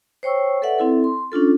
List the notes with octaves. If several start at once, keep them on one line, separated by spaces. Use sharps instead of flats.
C5 C#5 G5 C#6 E6
A4 B4 D5 E5 F#5
C4 E4 A4
C6
C#4 D4 F4 A4